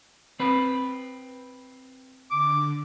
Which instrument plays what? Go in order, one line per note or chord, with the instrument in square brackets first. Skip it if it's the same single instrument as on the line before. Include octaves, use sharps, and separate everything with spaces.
[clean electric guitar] C4 B4
[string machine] D3 [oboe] D6